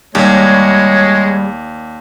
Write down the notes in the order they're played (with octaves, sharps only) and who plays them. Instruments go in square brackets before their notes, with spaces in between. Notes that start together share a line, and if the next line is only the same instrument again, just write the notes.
[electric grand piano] D#2 [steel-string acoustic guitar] G3 [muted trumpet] G#3 [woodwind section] C#5